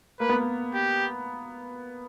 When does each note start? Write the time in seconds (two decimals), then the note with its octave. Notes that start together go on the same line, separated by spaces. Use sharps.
0.20 A#3 B4
0.29 B3
0.40 A#3
0.74 G4